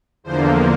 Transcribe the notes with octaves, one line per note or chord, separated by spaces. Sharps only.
E2 D3 F3 A#3 C5